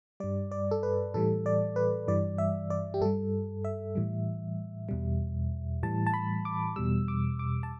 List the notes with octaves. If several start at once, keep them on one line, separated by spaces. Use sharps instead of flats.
G2 G3 D5
D5
A4
B4
A2 E3 G3 A4
D5
B4
G2 E3 G3 D5
E5
D5
G4
G2 G3 A4
E5
A2 E3 G3
E2 B2 G3
A2 E3 G3 A5
A5
B5
D6
E2 B2 G3 E6
D6
D6
A5